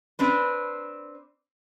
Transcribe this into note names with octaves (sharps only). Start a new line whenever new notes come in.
C4 D4 B4